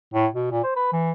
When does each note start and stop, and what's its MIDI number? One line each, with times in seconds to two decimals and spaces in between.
0.14 0.27 45
0.34 0.48 47
0.52 0.61 46
0.64 0.76 72
0.76 0.89 71
0.93 1.12 52